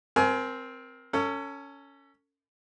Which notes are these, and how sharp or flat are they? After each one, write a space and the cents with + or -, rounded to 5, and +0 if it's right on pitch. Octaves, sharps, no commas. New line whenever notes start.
C4 +0 A#4 +20 G#5 +30
C#4 +10 A4 +40